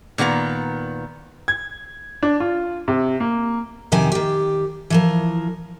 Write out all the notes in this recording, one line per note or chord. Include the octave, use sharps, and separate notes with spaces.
A#2 D#3 B3 F#4 A#5
G#6
D4
F4
C3
A#3
F2 C3 D#3 G4 G#5
D#3 G4
E3 F3 A#4